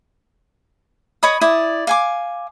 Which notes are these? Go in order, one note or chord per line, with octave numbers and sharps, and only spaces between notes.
C#5 D#5 B5 D#6
E4 D5 D#6
F5 G#5 D6